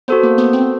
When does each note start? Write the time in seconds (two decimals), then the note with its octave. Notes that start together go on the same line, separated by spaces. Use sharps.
0.08 B3 F#4 A4 C5
0.23 A#3
0.38 B3
0.53 C4